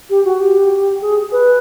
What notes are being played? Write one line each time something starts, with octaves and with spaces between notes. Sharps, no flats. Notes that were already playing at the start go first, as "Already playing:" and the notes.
G4
F#4
G4
G#4
B4